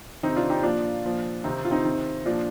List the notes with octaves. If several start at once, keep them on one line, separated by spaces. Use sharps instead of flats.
C3 D#3 C4 D#4
D4 F4
D#4 G4
A#2 F3 D4 F4
A#2 F3
C3 D#3 C4 D#4
F4
C4 D#4
C3 D#3
A#2 F3 D4 F4